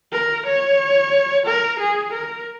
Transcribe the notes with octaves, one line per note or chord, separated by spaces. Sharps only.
A#4
C#5
A#4
G#4
A#4